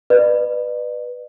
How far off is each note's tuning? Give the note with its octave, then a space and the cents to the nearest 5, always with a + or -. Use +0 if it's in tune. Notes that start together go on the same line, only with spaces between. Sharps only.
B4 +0 D5 +40